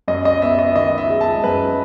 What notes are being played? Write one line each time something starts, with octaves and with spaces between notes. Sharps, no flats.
F#2 D#5
D#5
B3 E5
D#5
D#3 D#5
E5
G#3
A5
F#2 B4